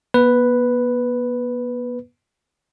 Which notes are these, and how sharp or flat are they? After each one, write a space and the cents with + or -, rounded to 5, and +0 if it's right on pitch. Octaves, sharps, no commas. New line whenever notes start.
B3 -40 B4 +0